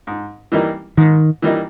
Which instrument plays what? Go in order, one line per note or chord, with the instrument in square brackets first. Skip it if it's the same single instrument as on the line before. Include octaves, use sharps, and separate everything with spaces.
[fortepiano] G#2
E3 G3 A#3 D#4
[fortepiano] G#2 [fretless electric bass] D#3
[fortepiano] E3 G3 A#3 D#4